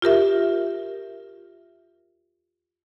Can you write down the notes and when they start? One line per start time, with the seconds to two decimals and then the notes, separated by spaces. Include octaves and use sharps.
0.02 F4 G4 A#4 E5